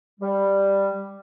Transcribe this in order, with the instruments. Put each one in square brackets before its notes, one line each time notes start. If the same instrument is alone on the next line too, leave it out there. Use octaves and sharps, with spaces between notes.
[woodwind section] G3